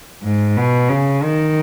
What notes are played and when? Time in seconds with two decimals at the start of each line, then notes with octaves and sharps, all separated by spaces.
0.23 G#2
0.57 B2
0.89 C#3
1.23 D#3